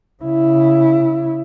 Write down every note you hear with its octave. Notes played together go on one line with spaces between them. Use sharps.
C#3 E4